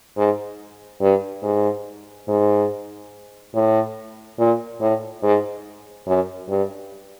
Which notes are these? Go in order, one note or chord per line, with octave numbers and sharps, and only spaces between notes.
G#2
G2
G#2
G#2
A2
A#2
A2
G#2
F#2
G2